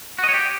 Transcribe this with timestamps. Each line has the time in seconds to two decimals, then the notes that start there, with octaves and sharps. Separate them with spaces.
0.19 F#4
0.24 D#5
0.29 C#5
0.34 G4